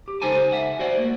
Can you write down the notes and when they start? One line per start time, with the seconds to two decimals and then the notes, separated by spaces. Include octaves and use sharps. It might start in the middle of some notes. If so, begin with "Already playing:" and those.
0.08 G4
0.21 C#2 D#4 A4 C5 G#5 A5
0.52 E5 F#5
0.79 F#4 C5 D5 F#5
0.97 A3 A#3